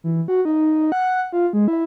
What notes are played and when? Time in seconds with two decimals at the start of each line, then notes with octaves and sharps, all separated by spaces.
0.04 E3
0.28 F#4
0.45 D#4
0.92 F#5
1.33 F4
1.53 G#3
1.68 E4